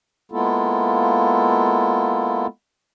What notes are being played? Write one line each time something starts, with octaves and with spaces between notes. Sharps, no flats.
G#3 A#3 B3 E4 F4 A4